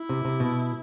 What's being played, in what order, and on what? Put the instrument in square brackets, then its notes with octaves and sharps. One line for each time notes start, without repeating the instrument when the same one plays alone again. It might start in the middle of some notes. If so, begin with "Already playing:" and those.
Already playing: [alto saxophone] E4
[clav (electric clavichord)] C3
C3
B2